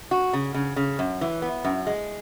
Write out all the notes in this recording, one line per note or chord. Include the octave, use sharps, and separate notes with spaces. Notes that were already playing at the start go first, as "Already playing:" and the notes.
F#4
C#3
C#3
C#3
F#2
E3
B3
F#2
G#3